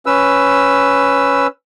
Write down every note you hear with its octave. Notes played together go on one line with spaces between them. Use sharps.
C#4 B4 E6